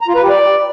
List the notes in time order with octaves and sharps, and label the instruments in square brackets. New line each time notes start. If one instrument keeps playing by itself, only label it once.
[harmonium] A#5
F4
B4
G4
D5